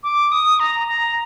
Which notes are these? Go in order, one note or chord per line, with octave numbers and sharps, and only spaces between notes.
D6
D#6
A#5
A#5